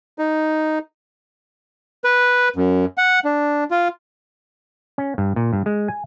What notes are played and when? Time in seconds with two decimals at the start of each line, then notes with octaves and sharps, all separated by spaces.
0.18 D#4
2.04 B4
2.56 F#2
2.98 F#5
3.25 D4
3.71 F4
4.98 C#4
5.18 G2
5.36 A#2
5.53 G2
5.66 G#3
5.88 G#5